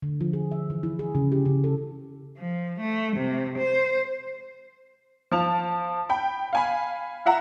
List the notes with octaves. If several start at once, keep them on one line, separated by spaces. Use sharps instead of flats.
D3
F3
G#4
E5
E3
E4
G#4
C#3
G4
C#3
A4
F3
A3
C3
C5
F3 A5 F7
G5 B5
F5 G#5 B5
F4 E5 F#5 A#5